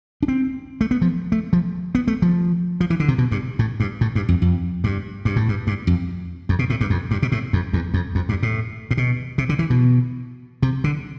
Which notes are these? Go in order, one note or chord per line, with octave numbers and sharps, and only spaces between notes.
D4
C4
A3
B3
F3
A3
F3
B3
A3
F3
F3
E3
D3
C3
B2
G2
A2
G2
A2
G2
F2
F2
G2
G2
A2
G2
G2
F2
F2
B2
A2
G2
F2
G2
B2
A2
F2
E2
F2
F2
G2
A2
A2
B2
C3
D3
E3
B2
C3
D3